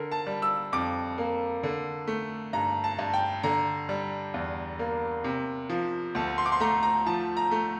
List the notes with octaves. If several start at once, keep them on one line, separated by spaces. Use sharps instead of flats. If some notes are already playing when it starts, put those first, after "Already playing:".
Already playing: D3 A#4
A5
G3
E6
F2 D6
A#3
D3
A3
G2 A#5
A5
G2
G5
D3 A#5
G3
E2
A#3
C3
F3
D2 A5
C6
D6
C6
A3 A#5
A#5
F3 A5
A#5
A3